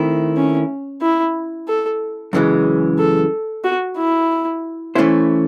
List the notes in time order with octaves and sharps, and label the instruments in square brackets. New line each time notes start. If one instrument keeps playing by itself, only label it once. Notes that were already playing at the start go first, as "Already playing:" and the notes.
Already playing: [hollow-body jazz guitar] D#3 A3 C4 E4
[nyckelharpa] C#4
E4
A4
[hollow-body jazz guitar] F#2 C#3 E3 G#3
[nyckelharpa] A4
F#4
E4
[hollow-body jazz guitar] E3 A3 C#4 E4 C5